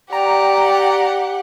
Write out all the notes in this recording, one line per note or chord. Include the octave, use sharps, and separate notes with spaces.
G4 D5 F#5 G5 A#5